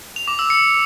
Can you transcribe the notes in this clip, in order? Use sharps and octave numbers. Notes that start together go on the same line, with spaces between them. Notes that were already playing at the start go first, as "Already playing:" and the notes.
F7
D6
E6
C#7